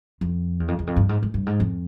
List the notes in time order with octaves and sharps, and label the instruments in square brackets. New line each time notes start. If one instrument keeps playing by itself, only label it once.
[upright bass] F2
E2
F2
E2
F2
G2
G#2
G#2
G2
G#2
F2